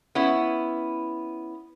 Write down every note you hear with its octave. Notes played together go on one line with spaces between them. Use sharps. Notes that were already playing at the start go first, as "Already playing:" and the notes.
B3 C#4 E4